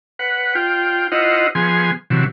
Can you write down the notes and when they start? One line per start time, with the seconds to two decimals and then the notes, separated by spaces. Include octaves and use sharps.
0.19 B4 F#5
0.55 F4 G5
1.12 E4 F4 C5 D#5 F#5
1.55 F3 B3 G#4 G#5 C6
2.10 C3 E3 F#3